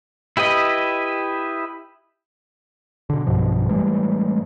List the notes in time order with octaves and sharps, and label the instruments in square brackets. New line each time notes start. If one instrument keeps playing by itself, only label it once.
[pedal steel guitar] E4 G4 B4 D#5
[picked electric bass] B2 D3
B1 G2 B2 F3
A2 E3 G3 G#3